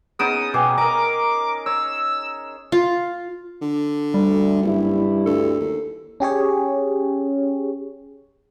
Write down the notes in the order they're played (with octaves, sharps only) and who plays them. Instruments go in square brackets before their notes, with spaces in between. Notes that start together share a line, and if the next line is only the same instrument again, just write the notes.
[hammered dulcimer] B3 C#4 D#4 [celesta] G#4 D7 E7 [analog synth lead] D#6
[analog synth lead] B2 [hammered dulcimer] G#4 [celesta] G5 G#5 D6
[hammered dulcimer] A#4 D#5 [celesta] A#5 [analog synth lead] D6
[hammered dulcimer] C#5 [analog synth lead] E6
[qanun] F4
[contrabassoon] D3
[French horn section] D2 [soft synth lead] G3
[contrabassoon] F#1 [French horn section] G2 E4
[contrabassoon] D2 [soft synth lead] A4
[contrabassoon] D#2
[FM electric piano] C#4 G4 G#4 C#5